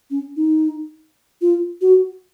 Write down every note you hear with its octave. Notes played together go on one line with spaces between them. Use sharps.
C#4
D#4
F4
F#4